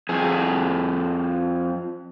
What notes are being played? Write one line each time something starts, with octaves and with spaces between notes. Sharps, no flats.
F2 G#4